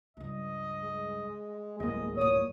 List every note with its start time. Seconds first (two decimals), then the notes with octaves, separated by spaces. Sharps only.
0.17 C#2 G2 D#5
0.84 G#3
1.80 D1 G1 D#2 G#3 A#3 D#5
2.17 F#2 A#2 C#5 D#6